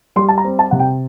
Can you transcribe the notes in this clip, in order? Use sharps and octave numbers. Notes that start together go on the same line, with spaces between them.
G3 C6
A5
A#5
C4
A5
C3 F#5
G5